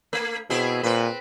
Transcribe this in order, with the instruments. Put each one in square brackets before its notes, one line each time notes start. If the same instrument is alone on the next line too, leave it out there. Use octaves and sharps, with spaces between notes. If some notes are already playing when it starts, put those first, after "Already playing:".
[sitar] A3
[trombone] B2 [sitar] C4 E4 G#4
[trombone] A#2 [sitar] C4 B4